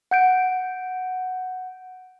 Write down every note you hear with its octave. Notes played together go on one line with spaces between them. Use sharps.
F#5 G6 D7